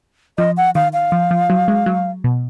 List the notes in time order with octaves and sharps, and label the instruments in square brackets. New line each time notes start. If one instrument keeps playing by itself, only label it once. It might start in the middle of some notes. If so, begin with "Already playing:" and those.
[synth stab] F3 [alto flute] D#5
[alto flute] F#5
[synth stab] D#3 [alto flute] F5
[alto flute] F5
[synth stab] F3
F3
F#3
G#3
F#3
B2